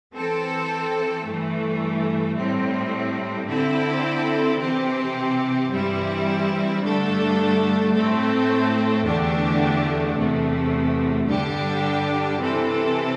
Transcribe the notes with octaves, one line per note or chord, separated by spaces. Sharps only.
E3 C4 A4
G2 E3 A3
A2 G3 C4
D3 C4 E4 A4
C3 E3 C4 G4
G2 E3 G3 C4 E4
G2 D3 A3 D4 A4
A2 A3 C4 A4
E2 D3 A3 D4 G4
E2 C3 A3
G2 D3 G3 D4 G4
C3 E3 C4 A4